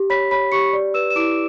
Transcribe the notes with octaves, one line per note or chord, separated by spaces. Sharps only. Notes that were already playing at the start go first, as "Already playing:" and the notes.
Already playing: G4
C#5 B5 B6
C#5 B5 B6
G4 C#6 C#7
D5
B4 E6 E7
E7
E4 D6 D7